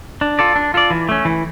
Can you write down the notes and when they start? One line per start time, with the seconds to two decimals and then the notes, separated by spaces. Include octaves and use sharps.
0.21 D4
0.39 F4 A4 D5
0.56 D4
0.74 F4 A4 D5
0.90 E3
1.09 A3 C#4
1.25 E3